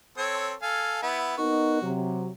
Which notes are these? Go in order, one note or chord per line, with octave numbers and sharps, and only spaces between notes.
C4 A4 C#5
A4 F5 G#5
B3 E4
B3 D#4 F#4 A#4
C3 F#3